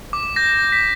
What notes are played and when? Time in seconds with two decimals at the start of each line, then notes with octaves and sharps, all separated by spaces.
0.13 D6
0.36 G6 A#6
0.59 G6
0.72 B6